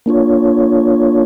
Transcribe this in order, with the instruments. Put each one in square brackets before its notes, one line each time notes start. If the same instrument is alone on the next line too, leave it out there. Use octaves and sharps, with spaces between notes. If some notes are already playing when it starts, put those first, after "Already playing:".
[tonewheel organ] A#3 D4 F4 C#5